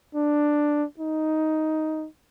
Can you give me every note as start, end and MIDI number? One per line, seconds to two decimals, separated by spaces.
0.15 0.85 62
1.00 2.07 63